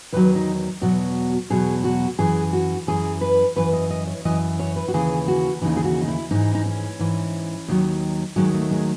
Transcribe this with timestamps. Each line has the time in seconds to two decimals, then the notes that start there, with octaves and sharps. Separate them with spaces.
0.13 E2 D#3 F#3 B4
0.35 D#4
0.81 E2 B2 F#3 F#4
1.50 E2 B2 F#3 G#4
1.84 F#4
2.19 F#2 E3 G#4
2.53 F#4
2.87 F#2 E3 G#4
3.21 B4
3.56 F#2 E3 B4
3.73 D#5
3.90 D#5
4.07 C#5
4.25 F#2 E3 D#5
4.60 C#5
4.76 B4
4.88 F#4
4.93 D#2 C#3 E3 G#4
5.28 F#4
5.62 D#2 C#3 E3 D#4
5.77 G#4
5.84 F#4
6.02 D#4
6.08 E4
6.31 G#2 E3 D#4
6.55 D#4
6.66 C#4
6.99 G#2 E3
7.68 D#2 D#3 F#3
8.36 D#2 D#3 F#3 G#3
8.54 A3
8.71 G#3